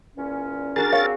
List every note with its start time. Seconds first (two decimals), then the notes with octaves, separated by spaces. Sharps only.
0.16 E2 A#2 C#4
0.76 D4 F#4 G#4 A#4 A6
0.92 A#3 C4 C#5 F5